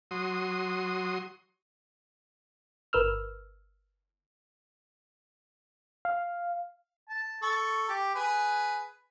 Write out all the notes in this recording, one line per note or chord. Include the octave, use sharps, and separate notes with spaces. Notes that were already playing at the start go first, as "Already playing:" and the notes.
F#3 C6 D#6
G1 A#4 B4 E6 F6
F5
A5
A4 C#6
G4
G#4 B4